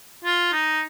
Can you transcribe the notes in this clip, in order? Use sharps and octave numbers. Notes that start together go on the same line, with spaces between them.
F4
D#4